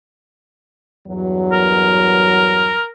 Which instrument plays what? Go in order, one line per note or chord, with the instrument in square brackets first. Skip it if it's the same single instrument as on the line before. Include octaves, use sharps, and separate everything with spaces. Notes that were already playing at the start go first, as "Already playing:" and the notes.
[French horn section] E2 G2 F#3
[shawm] A#4